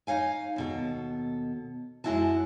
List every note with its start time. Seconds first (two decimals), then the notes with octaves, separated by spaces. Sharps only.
0.07 D#4 C#5 F5 G#5
0.56 D#2 B2 A4
2.04 F#2 F#3 G#3 E4 F#4 A5